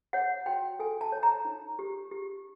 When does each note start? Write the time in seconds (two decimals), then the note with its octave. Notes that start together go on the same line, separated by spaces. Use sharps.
0.13 C#5 F#5
0.46 F#4 G5
0.79 A4 G#5
1.01 A5
1.12 C#5
1.23 A#5
1.45 D#4
1.79 G4
2.11 G4